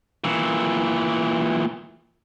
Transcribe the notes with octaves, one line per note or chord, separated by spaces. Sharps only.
A#2 E3